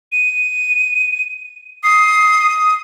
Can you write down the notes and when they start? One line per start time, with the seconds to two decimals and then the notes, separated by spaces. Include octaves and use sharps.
0.12 D#7
1.84 D#6 C7